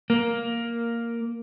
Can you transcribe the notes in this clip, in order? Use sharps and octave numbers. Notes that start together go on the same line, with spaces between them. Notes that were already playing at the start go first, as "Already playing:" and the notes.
A#3